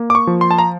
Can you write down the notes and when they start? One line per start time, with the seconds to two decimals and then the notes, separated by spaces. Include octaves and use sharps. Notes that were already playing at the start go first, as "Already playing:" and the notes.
Already playing: A#3
0.10 D6
0.15 C#6
0.27 F3
0.41 C6
0.51 A5
0.59 A#5